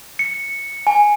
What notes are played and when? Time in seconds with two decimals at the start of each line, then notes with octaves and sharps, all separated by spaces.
0.19 C#7
0.87 G#5